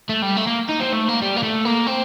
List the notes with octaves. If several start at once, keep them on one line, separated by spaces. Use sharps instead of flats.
A3
G3
A3
A#3
D#4
C4
A3
A#3
G3
A#3
A3
A#3
C4